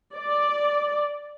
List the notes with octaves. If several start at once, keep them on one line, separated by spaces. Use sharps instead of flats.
D5